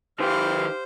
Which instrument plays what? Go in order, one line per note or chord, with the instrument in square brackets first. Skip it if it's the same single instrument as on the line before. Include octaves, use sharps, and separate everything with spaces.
[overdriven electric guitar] D#3 B4 [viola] G4 F5 [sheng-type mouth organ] C5 [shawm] C6